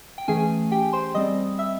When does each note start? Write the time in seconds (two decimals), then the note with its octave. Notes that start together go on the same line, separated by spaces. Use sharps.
0.18 G5
0.28 E3 A3 C#4 G#4 G#5
0.72 G4 G5
0.93 C5 C6
1.14 G3 C4 D#5 D#6
1.59 E5 E6